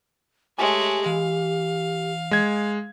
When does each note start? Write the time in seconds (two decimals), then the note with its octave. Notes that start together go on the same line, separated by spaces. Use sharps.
0.59 G#3 A3 G4 C#5 G#5
1.06 E3 F5
2.31 G#3 G#6